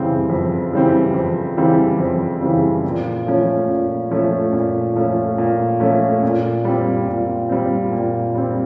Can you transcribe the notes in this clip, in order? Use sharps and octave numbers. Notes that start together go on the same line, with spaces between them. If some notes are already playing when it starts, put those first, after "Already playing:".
Already playing: F2 C#3 E3 G3 C4
F2
C#3 E3 G3 C4
F2
C#3 E3 G3 C4
F2
C#3 E3 G3 C4
A#2
F3 A3 C#4
A#2
F3 A3 C#4
A#2
F3 A3 C#4
A#2
F3 A3 C#4
A#2
G3 C4
A#2
G3 C4
A#2
G3 C4